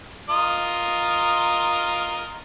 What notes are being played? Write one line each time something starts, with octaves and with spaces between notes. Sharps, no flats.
F4 A#4 D#5